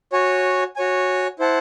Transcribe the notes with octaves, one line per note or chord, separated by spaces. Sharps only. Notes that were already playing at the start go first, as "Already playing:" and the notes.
F#4 C#5 G#5
F#4 C#5 G#5
E4 C5 F#5 A5